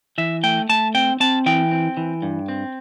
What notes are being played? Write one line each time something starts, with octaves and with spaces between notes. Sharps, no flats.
E3 E5
A3 G5
A3 A5
C4 G5
C4 A5
E3 G5
C4
E3
G2
C4